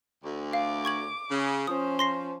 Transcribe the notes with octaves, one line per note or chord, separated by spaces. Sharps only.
D2
F5 D6
C#6 G#6 F#7
C#3
F3 C#4 C5 D#6
C6 A#6 C7